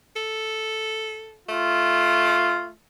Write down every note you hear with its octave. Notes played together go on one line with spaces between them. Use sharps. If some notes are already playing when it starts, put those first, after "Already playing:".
A4
A3 F4